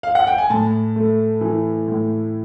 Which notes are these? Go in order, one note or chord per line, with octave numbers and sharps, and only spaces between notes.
F5
F#5
G5
G#5
A2 A5
A3
E3
A2